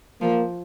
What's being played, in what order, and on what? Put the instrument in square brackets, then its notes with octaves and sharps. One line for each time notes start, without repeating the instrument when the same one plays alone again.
[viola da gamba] F3 [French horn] A#3